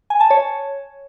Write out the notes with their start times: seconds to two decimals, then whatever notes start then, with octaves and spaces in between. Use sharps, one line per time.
0.10 G#5
0.20 A5
0.30 C#5